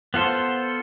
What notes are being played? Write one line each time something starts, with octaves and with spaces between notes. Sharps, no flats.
B3 F4 A4 C5